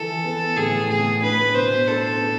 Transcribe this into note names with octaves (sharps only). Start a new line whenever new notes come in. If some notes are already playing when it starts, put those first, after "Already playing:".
Already playing: E3 A4
B3
A2 G#4
A2 G#4
D4 B4
B2 C5
D4 A4
B3